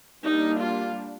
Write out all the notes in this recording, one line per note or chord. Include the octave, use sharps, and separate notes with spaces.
G3 A#3 D4 D#4
F4